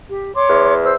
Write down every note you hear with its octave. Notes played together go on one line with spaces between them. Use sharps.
G4
C#5 C6 D6
E2
C5 E6